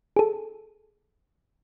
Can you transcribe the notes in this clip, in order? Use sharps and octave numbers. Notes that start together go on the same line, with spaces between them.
G#4 A4